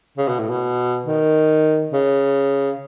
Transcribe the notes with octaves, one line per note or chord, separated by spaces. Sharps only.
C#3
B2
A2
B2
D#3
C#3